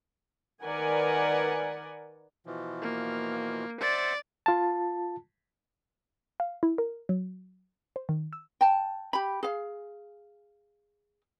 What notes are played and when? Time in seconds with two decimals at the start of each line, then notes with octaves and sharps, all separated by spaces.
0.63 D#3 A#4 B4 D5 F#5 G#5
2.46 B2 E3 F3
2.82 A#3
3.81 C5 D5 E5 F#5 A6
4.46 F4 A5
6.40 F5
6.63 E4
6.78 A#4
7.09 F#3
7.96 C5
8.09 D#3
8.33 E6
8.61 G5 A5
9.13 G4 B5
9.43 G#4 F5